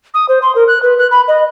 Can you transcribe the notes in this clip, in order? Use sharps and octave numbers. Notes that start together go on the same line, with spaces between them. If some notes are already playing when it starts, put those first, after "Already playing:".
D#6
C5
C6
A#4
F#6
B4
F#6
B5
D#5